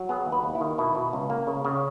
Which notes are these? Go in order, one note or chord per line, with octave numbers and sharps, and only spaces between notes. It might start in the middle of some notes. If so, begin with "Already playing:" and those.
Already playing: F#3
B3 G#4
D#2
B4
D#2
E4
D#3
B2 E4
B2
C#2
A#3
C#3
C#3